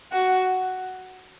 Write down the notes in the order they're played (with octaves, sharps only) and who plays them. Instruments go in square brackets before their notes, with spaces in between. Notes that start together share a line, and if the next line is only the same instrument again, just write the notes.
[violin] F#4